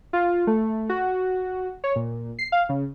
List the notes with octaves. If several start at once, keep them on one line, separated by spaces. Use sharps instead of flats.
F4
A3
F#4
C#5
A#2
C7
F5
C#3